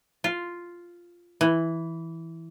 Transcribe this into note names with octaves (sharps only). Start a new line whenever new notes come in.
F4
E3